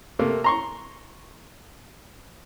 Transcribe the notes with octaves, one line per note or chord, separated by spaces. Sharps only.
C3 A3 A#3
A#5 C6 C#6